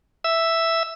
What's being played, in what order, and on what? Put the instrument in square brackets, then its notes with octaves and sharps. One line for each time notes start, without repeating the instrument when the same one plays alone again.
[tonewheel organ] E5 E6